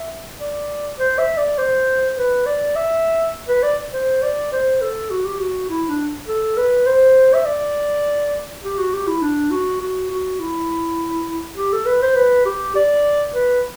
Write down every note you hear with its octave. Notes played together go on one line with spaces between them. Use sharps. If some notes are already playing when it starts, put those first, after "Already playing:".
Already playing: E5
D5
C5
E5
D5
C5
B4
D5
E5
B4
D5
C5
D5
C5
A4
F#4
G4
F#4
E4
D4
A4
B4
C5
E5
D5
G4
F#4
G4
E4
D4
F#4
F#4
F#4
E4
G4
A4
B4
C5
B4
G4
D5
B4